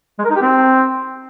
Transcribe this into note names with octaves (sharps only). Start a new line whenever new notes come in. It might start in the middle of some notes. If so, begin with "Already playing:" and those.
G#3
A#4
D#4
G4
C4